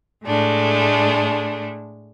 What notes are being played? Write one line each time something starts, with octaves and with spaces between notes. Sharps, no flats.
A2 G#3 A3 D4